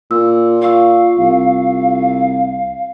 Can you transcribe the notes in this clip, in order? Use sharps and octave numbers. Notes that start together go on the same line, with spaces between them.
A#2 E6
F4 F5 C#6 E6
C2